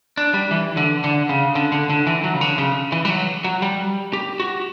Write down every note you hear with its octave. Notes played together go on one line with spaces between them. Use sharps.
D4
G3
E3
D3
D3
C#3
D3
D3
D3
E3
F#3
C#3
D3
C#3
E3
G3
F#3
F#3
G3
G4
F#4